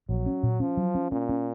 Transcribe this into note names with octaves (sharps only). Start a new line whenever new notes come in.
A#1 F#3
C#4
A#2
F3 C#4
F#3
C#4
A#2 C#4
C#4